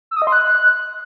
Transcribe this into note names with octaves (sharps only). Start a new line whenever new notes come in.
E6
D#6
D#5
C6
F#6